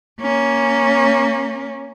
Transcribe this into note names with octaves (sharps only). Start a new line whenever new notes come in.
A#3 C#4